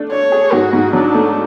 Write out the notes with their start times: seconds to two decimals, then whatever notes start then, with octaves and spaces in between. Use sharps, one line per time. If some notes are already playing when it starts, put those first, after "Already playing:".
Already playing: A3 D4
0.12 D4 C#5
0.32 G#4
0.52 G#2 F#4
0.73 G#2
0.93 F#3 D4
1.14 A3